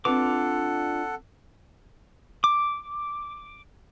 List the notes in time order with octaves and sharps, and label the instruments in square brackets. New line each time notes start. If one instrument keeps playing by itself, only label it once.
[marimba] C4 B4 [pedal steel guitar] D4 F4 D6 [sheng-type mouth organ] A4 F#5
[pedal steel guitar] D6